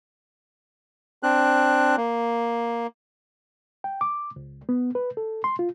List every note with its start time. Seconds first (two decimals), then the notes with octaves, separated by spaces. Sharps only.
1.23 C4 D4 F#6
1.97 A#3
3.84 G5
4.01 D6
4.36 C#2
4.69 B3
4.95 B4
5.17 A4
5.44 C6
5.59 F4